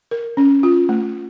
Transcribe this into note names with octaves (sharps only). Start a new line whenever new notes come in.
A#4
C#4
F4
A3